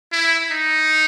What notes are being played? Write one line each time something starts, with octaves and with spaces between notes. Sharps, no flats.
E4
D#4